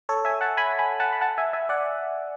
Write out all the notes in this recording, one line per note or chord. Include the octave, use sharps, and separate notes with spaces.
A4 C#5
E5 G#5
F#5 A5
G#5 B5
G#5 B5
F#5 A5
B5
F#5 A5
E5 G#5
E5 G#5
D5 F#5